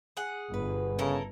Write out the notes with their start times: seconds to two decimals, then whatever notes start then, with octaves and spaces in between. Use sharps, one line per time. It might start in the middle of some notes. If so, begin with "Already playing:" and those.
0.17 G#4 F#5
0.54 G1 B2 B4
0.99 C#3 E4 A4 A#4